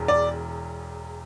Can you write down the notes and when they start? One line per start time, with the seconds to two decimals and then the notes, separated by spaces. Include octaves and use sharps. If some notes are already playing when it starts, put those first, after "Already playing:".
Already playing: E1 E2
0.08 D5